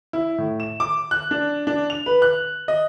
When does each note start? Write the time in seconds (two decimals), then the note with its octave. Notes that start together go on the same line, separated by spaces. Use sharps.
0.13 E4
0.38 A2
0.60 E7
0.80 D6
1.11 F#6
1.31 D4
1.67 D4
1.90 F7
2.06 B4
2.22 F#6
2.68 D#5